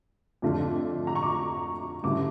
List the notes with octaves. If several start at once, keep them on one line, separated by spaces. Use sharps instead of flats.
F2 D3 A3 D4 F4
A#5
C#6
D6
G2 D3 A3 C#4 E4 D6